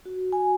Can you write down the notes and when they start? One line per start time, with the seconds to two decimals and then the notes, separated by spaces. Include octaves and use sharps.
0.05 F#4
0.33 G#5